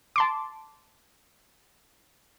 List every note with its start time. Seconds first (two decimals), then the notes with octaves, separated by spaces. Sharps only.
0.16 A5 C6 D6